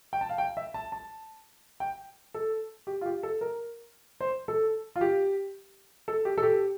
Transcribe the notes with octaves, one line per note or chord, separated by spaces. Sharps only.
G5
A5
F5
G5
E5
A5
A5
G5
A4
G4
F4
G4
A4
A#4
C5
A4
F4
G4
A4
G4
A4
G4